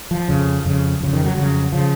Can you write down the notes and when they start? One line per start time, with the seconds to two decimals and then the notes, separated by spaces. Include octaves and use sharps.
0.11 F3
0.28 F2 C#3
0.65 F2 C#3
1.00 F2 C#3
1.13 D#3
1.25 F#3
1.37 F2 C#3 F#3
1.72 C#3 F3